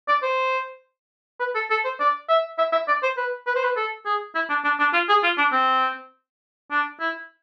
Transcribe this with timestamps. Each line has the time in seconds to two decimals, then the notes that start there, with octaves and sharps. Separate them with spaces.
0.08 D5
0.23 C5
1.40 B4
1.55 A4
1.70 A4
1.84 C5
2.00 D5
2.29 E5
2.58 E5
2.72 E5
2.88 D5
3.03 C5
3.17 B4
3.47 B4
3.56 C5
3.64 B4
3.77 A4
4.05 G#4
4.35 E4
4.49 D4
4.64 D4
4.80 D4
4.94 F4
5.09 G#4
5.23 F4
5.38 D4
5.52 C4
6.71 D4
7.00 E4